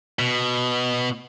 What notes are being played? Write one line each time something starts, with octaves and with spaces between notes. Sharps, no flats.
B2